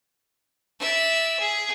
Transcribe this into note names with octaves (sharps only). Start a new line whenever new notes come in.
D5 E5
G#4